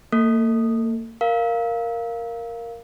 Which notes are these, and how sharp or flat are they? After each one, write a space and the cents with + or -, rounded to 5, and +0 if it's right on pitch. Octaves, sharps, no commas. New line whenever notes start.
A#3 -35 A4 +15
A#4 +0 F5 -5